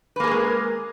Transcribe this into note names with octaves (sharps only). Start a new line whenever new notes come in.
G#3 A#3 G#4 A#4 B4